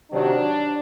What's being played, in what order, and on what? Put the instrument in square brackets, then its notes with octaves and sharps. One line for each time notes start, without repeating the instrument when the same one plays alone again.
[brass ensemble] C3 D#3 F#3 D4